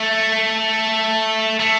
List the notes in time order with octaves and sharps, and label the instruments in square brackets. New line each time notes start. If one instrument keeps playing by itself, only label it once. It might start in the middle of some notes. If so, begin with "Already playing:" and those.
Already playing: [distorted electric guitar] A3
A3